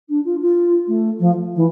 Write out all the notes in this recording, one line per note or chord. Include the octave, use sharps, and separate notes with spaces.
D4
F4
F4
A3
F3
E3